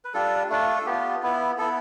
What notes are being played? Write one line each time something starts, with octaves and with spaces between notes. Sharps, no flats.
B4
G3 D4 F4 A4
A3 D4 F4
A4
B3 F4 G4
B3 E4
B3 E4 A4